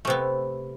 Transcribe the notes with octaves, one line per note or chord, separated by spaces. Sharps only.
C3 A3 B3